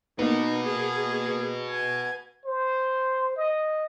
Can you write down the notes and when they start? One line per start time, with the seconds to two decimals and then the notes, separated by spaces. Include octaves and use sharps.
0.19 A#3 B3 D#4 F#4 B4
0.66 G#4
1.70 G#5
2.45 C5
3.36 D#5